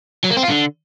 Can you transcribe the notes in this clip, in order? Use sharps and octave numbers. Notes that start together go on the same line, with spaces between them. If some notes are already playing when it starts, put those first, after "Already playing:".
F#3
A#3
C4
F4
D3